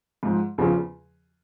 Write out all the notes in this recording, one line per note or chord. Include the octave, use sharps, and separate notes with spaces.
G#2 F3
E2 C#3 F3